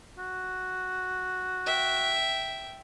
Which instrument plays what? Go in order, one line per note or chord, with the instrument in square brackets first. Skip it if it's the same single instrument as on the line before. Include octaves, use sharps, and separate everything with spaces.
[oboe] F#4
[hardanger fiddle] E5 G5